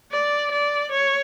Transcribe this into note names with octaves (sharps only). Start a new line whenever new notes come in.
D5
D5
C#5